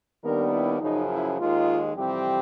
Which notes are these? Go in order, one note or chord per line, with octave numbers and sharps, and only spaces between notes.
D#2 D#3 G3 B3 D4 A#4
E4
F#2 C#3 F3 D#4
E4
D#2 D#3 G#3 F4
F2 C3 E3 G3 C4 G4